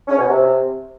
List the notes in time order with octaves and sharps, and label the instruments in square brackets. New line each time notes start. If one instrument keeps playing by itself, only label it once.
[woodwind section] C#4
B2
C3